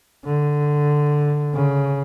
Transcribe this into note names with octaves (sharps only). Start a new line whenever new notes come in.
D3
C#3